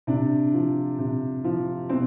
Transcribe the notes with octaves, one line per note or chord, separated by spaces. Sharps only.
C3 D4
F3
C3
F3
B2 C4